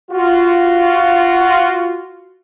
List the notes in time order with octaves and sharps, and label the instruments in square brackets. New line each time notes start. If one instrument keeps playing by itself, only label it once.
[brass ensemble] F4 F#4